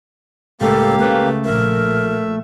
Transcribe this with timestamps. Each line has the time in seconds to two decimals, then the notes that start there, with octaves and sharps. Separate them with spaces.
0.61 C#2 A2 A#3 G4 A4 F5
0.99 C#3 A3 B4
1.45 A#1 A#4 E5